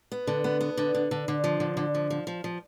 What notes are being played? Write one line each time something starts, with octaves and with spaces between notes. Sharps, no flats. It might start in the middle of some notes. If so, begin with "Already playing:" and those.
B3
D3
B3
B3
D3
D3
D3
D3
F3
D3
D3
F3
F3
F3
F3